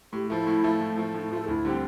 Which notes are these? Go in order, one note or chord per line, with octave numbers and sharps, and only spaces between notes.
A2 G4
F3 A3 E4
A2
F3 A3
A2
F3 A3
A2 D4
E4
F3 A3 F4
A4
D2 E4
D3 G3 C4 G4